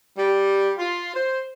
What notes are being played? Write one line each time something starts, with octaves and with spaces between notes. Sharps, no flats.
G3
F4
C5